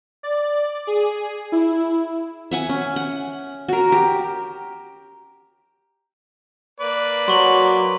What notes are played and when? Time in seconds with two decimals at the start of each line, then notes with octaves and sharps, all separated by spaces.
0.23 D5
0.87 G#4
1.52 E4
2.51 E5 F#5 G#5
2.69 C#4
2.96 F#5
3.68 F#4 A#4
3.92 G4
6.80 A#3 B4 D5
7.28 F#3 C6 C#6 F#7